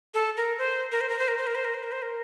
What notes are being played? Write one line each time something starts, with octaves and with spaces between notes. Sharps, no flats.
A4
A#4
C5
A#4
C5
A#4
C5
A#4
C5
A#4
C5
A#4
C5
A#4
C5
A#4